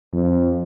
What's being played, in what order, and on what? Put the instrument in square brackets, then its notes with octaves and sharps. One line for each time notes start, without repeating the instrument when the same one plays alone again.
[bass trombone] F2